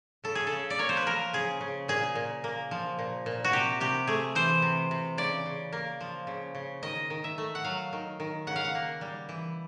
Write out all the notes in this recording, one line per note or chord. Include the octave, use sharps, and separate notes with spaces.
C#3 A4
G#4
A4
C#3
D5
A#3 C#5
C5
B4
F3 A#4
C#3 G#4
C#3
A#2 G#4
A#2
A#3
F3
A#2
A#2
F#4
C3 G4
C3 G4
A3 G#4
E3 C5
C3
C3
C#3 D5
C#3
A#3
F3
C#3
C#3
D#3 D#5
D#3
E5
A3
F#5
F#3 F5
D#3
D#3
C#3 F#5
F5
F#5
A#3
G3
E3